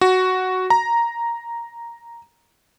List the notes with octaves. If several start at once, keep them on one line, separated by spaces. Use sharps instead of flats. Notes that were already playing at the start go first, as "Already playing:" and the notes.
F#4
A#5